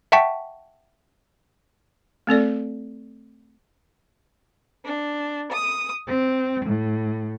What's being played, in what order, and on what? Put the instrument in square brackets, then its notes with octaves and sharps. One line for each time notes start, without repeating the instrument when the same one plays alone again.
[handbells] E5 F#5 G5 A5 C#6 B6
[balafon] A3 C4 A4 D5
[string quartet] D4
D#6
C4
A2